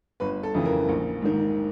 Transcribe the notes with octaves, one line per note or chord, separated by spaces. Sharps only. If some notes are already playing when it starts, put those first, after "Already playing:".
G1 B4
A4
F2 C#3 E3
A#4
A#1
G#2 D#3